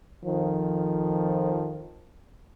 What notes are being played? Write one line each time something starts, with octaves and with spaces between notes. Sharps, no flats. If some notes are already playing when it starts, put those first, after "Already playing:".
F2 D#3 F3